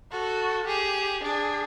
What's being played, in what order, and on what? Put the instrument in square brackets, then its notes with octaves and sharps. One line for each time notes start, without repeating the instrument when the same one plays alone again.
[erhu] F#4 [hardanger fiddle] A4
[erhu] G4 [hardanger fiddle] G#4
[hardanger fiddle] D4 [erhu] G#4